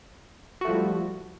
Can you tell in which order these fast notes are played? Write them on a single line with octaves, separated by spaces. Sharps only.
F#4 A3 F3 G3 E4